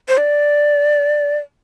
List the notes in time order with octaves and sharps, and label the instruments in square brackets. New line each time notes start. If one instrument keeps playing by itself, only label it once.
[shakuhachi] C5
D5